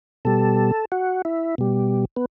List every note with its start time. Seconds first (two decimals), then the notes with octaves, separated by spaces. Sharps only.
0.25 B2 G3 A4
0.92 F#4
1.25 E4
1.58 B2 G3
2.17 B3